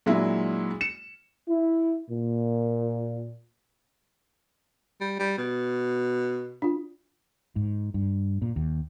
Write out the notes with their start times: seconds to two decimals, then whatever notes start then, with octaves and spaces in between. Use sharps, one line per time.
0.06 A#2 F#3 G#3 D4 E4
0.81 C#7 E7
1.49 E4
2.10 A#2
5.01 G3
5.19 G3
5.38 B2
6.62 D4 F4
7.56 G#2
7.94 G2
8.42 A#2
8.56 D#2